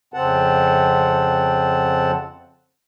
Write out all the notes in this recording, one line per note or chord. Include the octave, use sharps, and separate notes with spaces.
F2 C#3 C4 F#5 A5